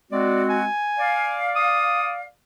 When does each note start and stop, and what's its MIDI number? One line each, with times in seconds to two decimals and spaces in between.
0.12 0.65 56
0.12 0.65 60
0.12 0.65 66
0.12 0.43 74
0.50 1.41 80
0.99 2.26 74
0.99 2.26 77
1.56 2.11 87